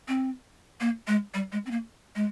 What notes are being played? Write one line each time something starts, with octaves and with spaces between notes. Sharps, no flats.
C4
A#3
G#3
G3
G#3
C4
A#3
G#3